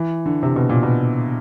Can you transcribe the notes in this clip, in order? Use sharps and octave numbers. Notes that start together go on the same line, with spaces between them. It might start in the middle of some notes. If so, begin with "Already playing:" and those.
Already playing: E3
D3
C3
B2
A#2
B2